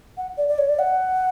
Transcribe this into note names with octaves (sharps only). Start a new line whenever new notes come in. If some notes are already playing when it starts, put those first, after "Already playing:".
F#5
D5
D5
C#5
D5
F#5